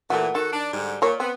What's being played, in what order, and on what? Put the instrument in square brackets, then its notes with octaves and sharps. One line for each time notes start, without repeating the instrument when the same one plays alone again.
[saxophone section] A#2 E3 [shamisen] A3 F#4
[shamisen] D#3 [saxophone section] F#4 A4
[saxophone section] D4
G#2 D3 G3
[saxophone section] A#2 [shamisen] A#4 C#5
[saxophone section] B3 [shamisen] C4